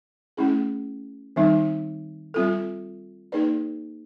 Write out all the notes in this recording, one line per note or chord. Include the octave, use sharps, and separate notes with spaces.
A3 C#4 E4 G#4
D#3 G3 C4 D#4
G3 C4 F4 A4
A#3 D#4 G#4 B4 D5